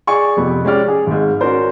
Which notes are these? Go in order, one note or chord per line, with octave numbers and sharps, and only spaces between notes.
G#4 D5 G#5 C#6
F2 C3 B3
G#3 C#4 G4 D5 F6
G#4
G#1 G#2
C#4 F#4 A#4 C5 D5